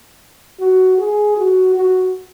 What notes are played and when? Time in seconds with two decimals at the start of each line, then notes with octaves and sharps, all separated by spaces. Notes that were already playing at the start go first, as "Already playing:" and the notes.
0.60 F#4
0.98 G#4
1.36 F#4
1.75 F#4